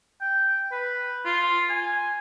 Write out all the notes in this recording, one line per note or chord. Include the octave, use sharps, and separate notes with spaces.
G5
B4
F4
G#5